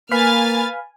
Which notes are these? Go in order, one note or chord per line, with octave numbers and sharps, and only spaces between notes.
A#3 B4 F5 G#5 B5 F6 A6